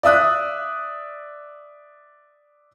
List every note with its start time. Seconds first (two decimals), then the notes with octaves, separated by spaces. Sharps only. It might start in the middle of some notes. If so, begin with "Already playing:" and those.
0.03 D5 E5 D#6 F#6